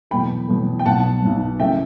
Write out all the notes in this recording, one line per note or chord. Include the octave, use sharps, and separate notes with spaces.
E2 B2 F#3 A3 G5 B5
E2 B2 F#3 A3
G5
B1 B2 F#3 F#5 A5
B1 B2 F#3
F#2 C#3 E3 A3 E5 G5